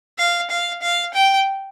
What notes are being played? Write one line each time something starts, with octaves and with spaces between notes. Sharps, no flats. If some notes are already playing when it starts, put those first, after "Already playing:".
F5
F5
F5
G5